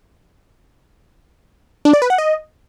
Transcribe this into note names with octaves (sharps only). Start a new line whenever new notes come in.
D4
D5
B4
F#5
D#5